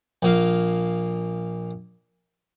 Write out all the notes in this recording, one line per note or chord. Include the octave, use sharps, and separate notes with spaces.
A#1 A#3 F5